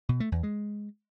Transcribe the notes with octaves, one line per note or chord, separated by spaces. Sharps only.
B2
A3
E2
G#3